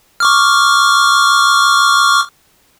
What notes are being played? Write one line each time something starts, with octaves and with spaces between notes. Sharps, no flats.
C#6 D6 F6